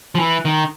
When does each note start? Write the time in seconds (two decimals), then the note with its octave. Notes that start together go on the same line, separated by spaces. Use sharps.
0.15 F3
0.19 E3
0.45 D#3